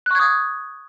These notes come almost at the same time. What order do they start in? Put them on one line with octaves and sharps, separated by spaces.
F#6 C#6 G#6 D#6